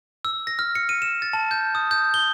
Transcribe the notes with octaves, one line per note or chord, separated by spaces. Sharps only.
E6
A#6
F6
C#7
D#7
E7
A6
A5
G6
D#6
G6
G7